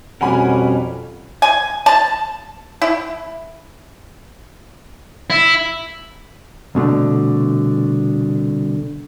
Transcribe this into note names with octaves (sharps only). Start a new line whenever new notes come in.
F2 B2 G3 C#4 A#4 F#5 G#5 B5
G#5
A5
E4
E4
C2 B2 D3 A3